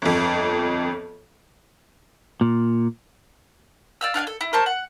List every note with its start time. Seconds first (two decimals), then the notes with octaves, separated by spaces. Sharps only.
0.02 G1 F2
2.41 A#2
4.01 D5 F5 E6
4.14 D4 F5 F#5 G#5
4.27 A4
4.41 E4
4.53 A#4 C5 A5 C#6
4.66 F#5